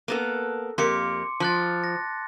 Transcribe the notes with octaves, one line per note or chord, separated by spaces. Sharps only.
A#3 B3 A4
F2 A#3 G4 C6 D6 C#7
F3 A5 F#6 A6
A#6